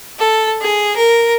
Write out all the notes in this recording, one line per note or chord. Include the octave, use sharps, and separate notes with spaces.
A4
G#4
A#4